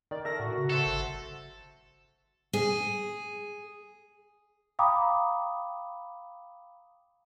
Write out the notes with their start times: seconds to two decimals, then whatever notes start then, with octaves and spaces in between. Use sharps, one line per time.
0.11 D#3 D5
0.25 A4 A#4 E5 A#6
0.39 A2 F#4
0.57 C#3
0.70 A4 C5 E5 F#5
0.85 G1
2.53 G#4
4.79 F5 G5 A#5 B5 D6 D#6